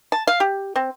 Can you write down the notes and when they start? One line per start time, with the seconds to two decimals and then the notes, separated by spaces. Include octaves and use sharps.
0.12 A5
0.27 F5
0.40 G4
0.76 C4